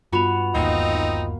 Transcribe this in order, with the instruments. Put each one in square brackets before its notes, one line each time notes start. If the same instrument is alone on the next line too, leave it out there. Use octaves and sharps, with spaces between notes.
[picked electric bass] G2 [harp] B3 F#4 [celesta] F4 B5 F7
[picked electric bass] G1 D#2 [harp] A#3 [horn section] C4 D#4